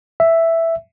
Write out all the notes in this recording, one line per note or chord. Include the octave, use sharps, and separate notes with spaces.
E5